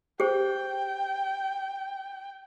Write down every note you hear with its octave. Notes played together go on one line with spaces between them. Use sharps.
G4 G#4 C5 G5